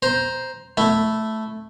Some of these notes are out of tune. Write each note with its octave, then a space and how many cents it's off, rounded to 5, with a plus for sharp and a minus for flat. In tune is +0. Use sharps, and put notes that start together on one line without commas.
C5 +0 A#5 +10
A3 +0 E4 +0